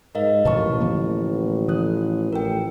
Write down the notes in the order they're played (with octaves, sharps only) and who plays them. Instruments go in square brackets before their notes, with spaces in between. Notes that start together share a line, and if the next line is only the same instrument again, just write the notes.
[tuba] G#2 [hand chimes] A#4 D#5 F5
[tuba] A1 [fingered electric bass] B2 F3 [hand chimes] B4 A5 C#6
[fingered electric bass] D3 F3 A#3
[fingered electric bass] F3 [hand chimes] D#6 F#6
[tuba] A1 [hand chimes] A#4 G5